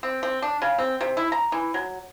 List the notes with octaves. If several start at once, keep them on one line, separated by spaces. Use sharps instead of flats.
C4
C4
D4
C#3
C4
C3
E4
A#5
E3
F#3